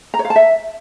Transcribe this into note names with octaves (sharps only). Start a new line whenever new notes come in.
A#5
C#5
F5
A5
E5